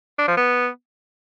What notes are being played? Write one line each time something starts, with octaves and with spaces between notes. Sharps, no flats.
D4
F3
B3